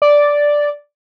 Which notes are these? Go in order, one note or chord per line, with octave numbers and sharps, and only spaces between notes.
D5